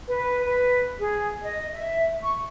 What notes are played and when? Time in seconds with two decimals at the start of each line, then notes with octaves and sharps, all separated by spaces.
0.08 B4
0.45 B4
0.99 G#4
1.42 D#5
1.72 E5
2.23 C#6